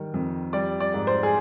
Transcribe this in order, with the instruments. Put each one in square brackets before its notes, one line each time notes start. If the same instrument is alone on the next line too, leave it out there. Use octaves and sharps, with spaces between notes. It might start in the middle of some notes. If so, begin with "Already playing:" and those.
Already playing: [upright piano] D#3 G3
F2
G3 D5
D5
G#2
C5
G#4